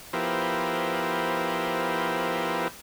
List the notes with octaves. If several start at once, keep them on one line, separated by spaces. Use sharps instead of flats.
F3 B3 E4 G4 A#4 C5